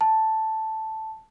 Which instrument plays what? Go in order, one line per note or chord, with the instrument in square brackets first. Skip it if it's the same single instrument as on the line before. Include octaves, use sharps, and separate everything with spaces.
[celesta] A5